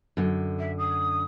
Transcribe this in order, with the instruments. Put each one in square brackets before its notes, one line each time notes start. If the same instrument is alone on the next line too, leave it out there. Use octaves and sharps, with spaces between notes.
[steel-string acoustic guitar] F#2 D3
[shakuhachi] E5
D#6